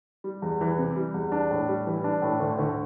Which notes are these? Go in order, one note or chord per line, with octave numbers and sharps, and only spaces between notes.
G3
E2
E3
C3
G3
E2
D4
A2
G3
E3
D4
A2
D2
D2